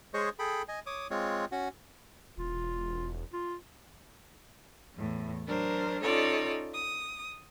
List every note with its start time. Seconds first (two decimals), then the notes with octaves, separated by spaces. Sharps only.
0.14 G#3 G#4 C5 C#5 D#5 C#6
0.39 G#4 A4 G5 B5
0.68 D#5 G#5
0.86 C#5 D6 D#6
1.10 G#3 C4 F4 C#5
1.52 C#4 F#4 F#5
2.37 E1 F4
3.33 F4
4.94 E2 A2
5.46 F#3 D4 A#4 C5
6.01 C#4 D#4 F4 A4 C#5 D5
6.73 D#6